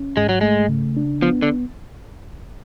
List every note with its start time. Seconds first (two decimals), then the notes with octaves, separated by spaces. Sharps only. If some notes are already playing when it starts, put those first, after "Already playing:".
Already playing: C#4
0.17 G#2 G#3
0.29 F#3
0.41 G#3 A3
0.69 C#3
0.97 D4
1.22 F3 B3
1.42 D3